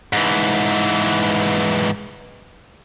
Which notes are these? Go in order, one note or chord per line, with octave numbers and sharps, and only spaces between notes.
G#2 E3